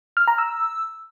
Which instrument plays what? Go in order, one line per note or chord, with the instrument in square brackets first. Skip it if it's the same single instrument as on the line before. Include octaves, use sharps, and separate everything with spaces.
[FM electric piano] F6
A#5
E6